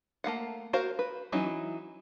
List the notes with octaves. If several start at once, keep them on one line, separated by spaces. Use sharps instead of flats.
A3 A#3 F5 F#5
F#4 A#4 C5 F5
B4
E3 F#3 C#4 D#4 E4